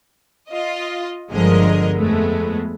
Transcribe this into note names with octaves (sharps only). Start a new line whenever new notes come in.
F4 D#5
G1 D3 F3 G#3 A#4 D#5
F2 G#3 A3 B3